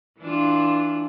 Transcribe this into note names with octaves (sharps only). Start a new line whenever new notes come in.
E3 D4 F4